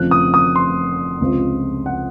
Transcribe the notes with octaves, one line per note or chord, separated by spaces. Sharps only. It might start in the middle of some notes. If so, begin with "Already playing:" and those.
Already playing: F1 F2 C#3 F3 F#6
D#6
D#6
C6
C#2 C3 F3 C4 F4
F#5